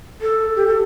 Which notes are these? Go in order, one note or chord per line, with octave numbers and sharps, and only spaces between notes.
A4
G4
A4